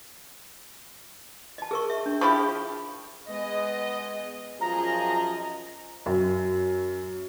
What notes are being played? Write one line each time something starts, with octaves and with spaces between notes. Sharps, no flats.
D#5 A5
G#4 A#4 C#6
E5
D4
F3 E4 G4 G#4 C#6
G#3 B3 D#5
F#2 F3 F4 G#4 D#5 A#5
F#2